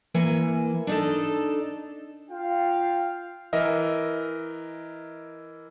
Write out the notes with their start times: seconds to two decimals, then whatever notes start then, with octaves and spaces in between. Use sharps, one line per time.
0.14 E3 A#3 G#5
0.87 D4 D#4 A4
2.30 F4 F5 G5
3.53 E3 A#4 D#5 E5